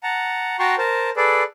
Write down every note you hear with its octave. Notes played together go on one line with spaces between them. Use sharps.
F#5 A5 A#5
F#4 G5 A5 A#5 C6 C#6
A#4 C5 A5
G#4 A4 B4 D5